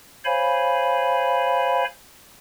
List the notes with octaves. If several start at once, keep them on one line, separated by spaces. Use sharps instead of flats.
C5 C#5 F5 G#5 B5